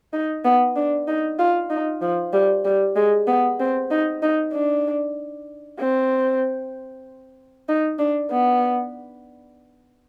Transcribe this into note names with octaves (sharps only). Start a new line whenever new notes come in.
D#4
B3
D4
D#4
F4
D#4
F3
G3
G3
G#3
B3
C4
D#4
D#4
D4
C4
D#4
D4
B3